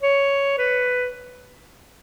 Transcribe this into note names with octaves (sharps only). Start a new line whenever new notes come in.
C#5
B4